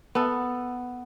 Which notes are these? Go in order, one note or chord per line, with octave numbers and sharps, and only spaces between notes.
B3 A4